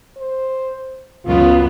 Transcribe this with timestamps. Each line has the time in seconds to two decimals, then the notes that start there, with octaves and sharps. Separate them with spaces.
0.17 C5
1.26 C#2 F#2 B3 F4